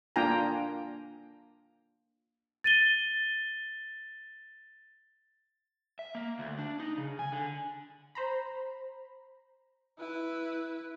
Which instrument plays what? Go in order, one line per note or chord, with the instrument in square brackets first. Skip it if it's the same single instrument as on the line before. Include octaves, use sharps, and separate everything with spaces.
[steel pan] A#3 D4 F4 G5 G#5 A#5
[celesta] A6 D#7 G7
[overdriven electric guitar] E5
A#3
D2
D4
D#4
C#3
G#5
D3
[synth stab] C5 A#5 B5
[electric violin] E4 B4